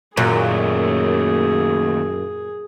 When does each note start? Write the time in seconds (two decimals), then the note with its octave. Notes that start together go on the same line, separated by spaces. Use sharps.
0.17 F#2 A#2 D#3 A3 A#3 G#4